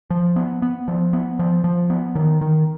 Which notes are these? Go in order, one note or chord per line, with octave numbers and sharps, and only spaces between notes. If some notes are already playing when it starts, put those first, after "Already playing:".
F3
B3
B3
F3
B3
F3
F3
B3
D#3
D#3